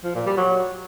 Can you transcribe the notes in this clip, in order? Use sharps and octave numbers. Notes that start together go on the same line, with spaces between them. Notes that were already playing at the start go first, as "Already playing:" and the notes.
F3
A#2
G3
F#3